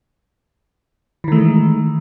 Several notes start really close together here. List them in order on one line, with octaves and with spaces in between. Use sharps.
E3 D#3 A3 G#3